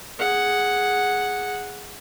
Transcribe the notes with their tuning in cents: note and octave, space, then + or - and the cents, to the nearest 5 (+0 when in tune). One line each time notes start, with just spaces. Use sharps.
G#4 +0 F#5 +0